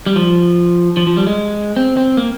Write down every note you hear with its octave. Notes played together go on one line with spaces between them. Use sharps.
G3
F3
F3
F3
G3
G#3
C4
C4
A#3